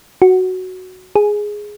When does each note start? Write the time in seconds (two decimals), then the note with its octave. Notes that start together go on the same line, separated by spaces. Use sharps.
0.22 F#4
1.16 G#4